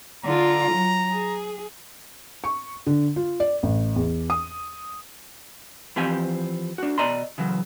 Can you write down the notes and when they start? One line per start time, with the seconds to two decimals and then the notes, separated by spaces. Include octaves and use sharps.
0.24 D3 F4 A#5
0.72 F#3
1.11 G#4
2.44 C#6
2.87 D3
3.16 F4
3.40 D5
3.63 A1
3.96 E2
4.30 D#6
5.96 E3 F3 C4 G4 F5 G#5
6.78 D4 F#4
6.98 B2 D5 D#5 A#5 C6
7.38 C#3 E3 F#3